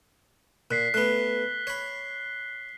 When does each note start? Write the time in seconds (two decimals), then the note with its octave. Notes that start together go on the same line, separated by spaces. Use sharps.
0.71 A#2 F#6 B6 C7
0.94 A3 B3 F#6 G7
1.67 C#5 B5